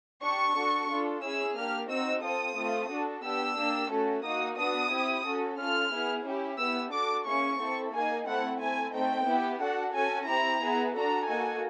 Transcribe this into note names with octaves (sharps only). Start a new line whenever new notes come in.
D4 G4 C#6
D4 F#4 A4
D4 F4 A4
C#4 E4 G#4 E6
A#3 D4 G4 F6
C4 D#4 F#4 E6
C4 F4 A4 D#6
A3 C4 F4
D4 F#4 A4
B3 D4 G4 E6
A#3 D4 G4
A3 C#4 F#4 A4
A#3 D#4 F#4 D#6
B3 D4 F#4 D#6
C4 E4 G4
C#4 F#4 A4
C#4 F4 A4 F6
B3 E4 G#4
C#4 E4 G4
B3 E4 G4 E6
D4 F#4 A4 D6
A#3 C#4 E4 G#4 C#6
C4 E4 A4
A#3 D#4 G#4 G#5
A3 C4 E4 F#5
A3 C4 E4 G#5
A3 C4 D#4 G5
B3 E4 G4
D4 F#4 A4 F#5
C#4 F#4 A4 G#5
C4 E4 G4 A#5
B3 E4 G#4
D4 F#4 A4 A#5
A#3 D#4 F#4 A4 G#5